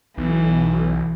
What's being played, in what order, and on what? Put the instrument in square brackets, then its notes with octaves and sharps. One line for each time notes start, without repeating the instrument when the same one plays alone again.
[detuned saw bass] B1 [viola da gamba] E3